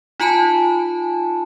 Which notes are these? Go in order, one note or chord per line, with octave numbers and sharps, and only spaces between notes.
D#4 F4 G#5 A5 B5